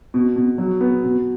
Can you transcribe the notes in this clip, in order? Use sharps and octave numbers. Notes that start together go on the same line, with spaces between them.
B2
B2
F#3
B3
B2